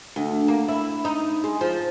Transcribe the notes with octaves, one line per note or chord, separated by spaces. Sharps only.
D2
A#3
E4
D#4
G#3
F3